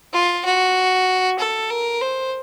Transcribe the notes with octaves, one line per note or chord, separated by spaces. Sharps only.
F4
F#4
A4
A#4
C5